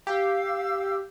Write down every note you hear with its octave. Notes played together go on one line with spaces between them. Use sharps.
G4 F5 E6